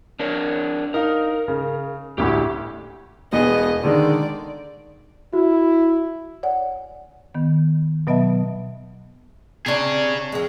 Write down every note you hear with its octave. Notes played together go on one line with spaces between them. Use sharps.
D4 A#4 C#5
D#4 A#4 F5
C#3
A1 D2 A2 G4
E1 B3 G#4 D#5
D3 D#3 G#3 D5
E4 F#4
C#5 D5 F#5 G#5
D#3 B3
B2 F#3 B3 D#5 E5 A5
C3 D4 G#4 C#5
F2 G#3